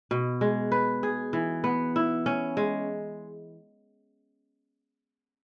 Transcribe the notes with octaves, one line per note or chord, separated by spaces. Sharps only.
B2
G#3
B4
G#4
E3
B3
E4
C#4
G#3